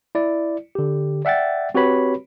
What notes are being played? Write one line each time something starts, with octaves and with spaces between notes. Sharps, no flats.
E4 D5
D3 G4
D5 E5 F#5 G5 A6
C4 F#4 G4 B4 C#5 B5